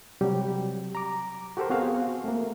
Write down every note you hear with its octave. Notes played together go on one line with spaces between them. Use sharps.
C3 F#3 G3 G4
A#5 D6
F#4 G4 A4 A#4 C5
B3 C4 F#4 G#4 F5
A3 A#3